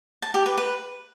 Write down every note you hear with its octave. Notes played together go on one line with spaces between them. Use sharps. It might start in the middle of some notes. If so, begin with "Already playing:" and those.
A5
G4
B4
B4